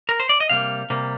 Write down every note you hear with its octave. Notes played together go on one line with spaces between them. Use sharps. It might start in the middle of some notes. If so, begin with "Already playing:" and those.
A#4
C5
D5
D#5
C3 G3 A#3 F5
C3 G3 A#3